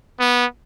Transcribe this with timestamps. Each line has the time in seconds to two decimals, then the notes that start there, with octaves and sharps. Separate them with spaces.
0.20 B3